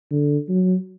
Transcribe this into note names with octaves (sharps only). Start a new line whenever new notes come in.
D3
F#3